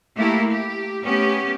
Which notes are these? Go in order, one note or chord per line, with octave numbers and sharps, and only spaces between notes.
A3 A#3 E4 G4
G4
A3 B3 C#4 G4